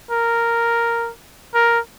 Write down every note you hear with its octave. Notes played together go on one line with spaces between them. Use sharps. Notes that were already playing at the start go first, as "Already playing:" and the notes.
A#4
A#4